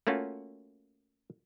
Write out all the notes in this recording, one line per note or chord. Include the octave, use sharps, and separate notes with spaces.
A3 A#3 C#4 F4 F#4